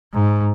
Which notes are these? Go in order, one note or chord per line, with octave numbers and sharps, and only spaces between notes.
G#2